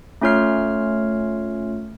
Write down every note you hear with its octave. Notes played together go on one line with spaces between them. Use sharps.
A3 C#4 F4 C#5 F6 C7